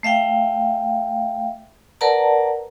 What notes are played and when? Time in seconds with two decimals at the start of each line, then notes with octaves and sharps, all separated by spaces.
0.03 A3 E5 F5 G5
2.01 A#4 B4 D5 F#5 A5 A#5